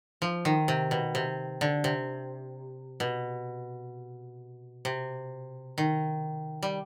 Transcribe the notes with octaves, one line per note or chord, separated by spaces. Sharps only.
F3
D#3
C3
B2
C3
D3
C3
B2
C3
D#3
G3